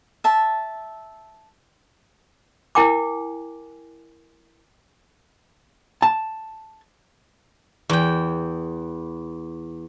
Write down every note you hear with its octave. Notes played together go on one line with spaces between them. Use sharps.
E5 A5
E4 A#4 G5 G#5 D6
A5
E2 G5